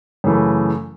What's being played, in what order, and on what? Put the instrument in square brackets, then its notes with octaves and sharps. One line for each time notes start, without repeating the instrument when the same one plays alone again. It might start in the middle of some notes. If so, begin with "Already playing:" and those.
[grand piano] F#2 C#3 E3 A3